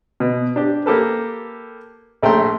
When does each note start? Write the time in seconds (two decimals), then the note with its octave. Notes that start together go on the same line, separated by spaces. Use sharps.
0.20 B2
0.56 D4 G4
0.86 A#3 G4 A4 B4
2.22 A#1 A3 G5 A#5 C6